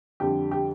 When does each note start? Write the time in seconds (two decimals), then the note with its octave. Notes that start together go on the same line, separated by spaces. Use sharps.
0.20 F2 D3 G3 G4
0.51 G4